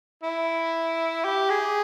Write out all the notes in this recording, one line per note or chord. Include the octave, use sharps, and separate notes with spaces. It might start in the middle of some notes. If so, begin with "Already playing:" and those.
E4
G4
G#4